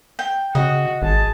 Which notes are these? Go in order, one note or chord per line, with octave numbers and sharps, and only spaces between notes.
G5
C#3 F#4 D#5
G#1 G#4 A5